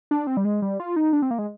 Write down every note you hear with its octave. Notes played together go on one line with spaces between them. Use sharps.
D4
C4
G3
G#3
G3
F4
D#4
D4
C4
A#3
G#3